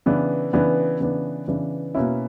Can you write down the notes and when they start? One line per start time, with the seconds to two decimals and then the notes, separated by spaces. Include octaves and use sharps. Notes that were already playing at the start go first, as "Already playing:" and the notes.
0.06 C#3 E3 B3 D4
0.53 C#3 E3 B3 D4
1.00 C#3 E3 B3 D4
1.47 C#3 E3 B3 D4
1.95 B2 A#3 C#4 E4